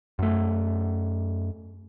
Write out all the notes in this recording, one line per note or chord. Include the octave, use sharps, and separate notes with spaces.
F#2 A3